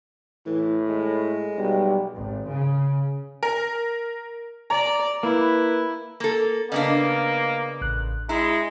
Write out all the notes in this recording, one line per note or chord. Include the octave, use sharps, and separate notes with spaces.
A2 E3
G#3
B1 G3
G#1
C#3
A#4
D5 A#5
A#3 E4 B4
A#3 A4
C#3 A#3 B3 D4 D#5
A1 F#6
G#3 E4 A#5